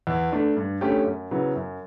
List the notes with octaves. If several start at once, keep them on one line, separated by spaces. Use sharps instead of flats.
E2
D3 A3 D4
G2
D3 A3 C#4 G4
F#2
C#3 F#3 B3 E4
F#2